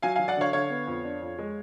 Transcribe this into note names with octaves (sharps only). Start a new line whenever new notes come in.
F#3 F5 G#5
F#3 F5 G#5
D5 F#5
D3 C#5 F5
D3 C#5 F5
B3
F2
D4
F2
G#3